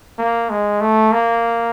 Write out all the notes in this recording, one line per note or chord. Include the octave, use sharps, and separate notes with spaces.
A#3
G#3
A3
A#3